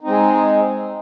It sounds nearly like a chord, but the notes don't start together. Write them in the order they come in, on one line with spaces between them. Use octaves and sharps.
D#4 C4 G#3 G#4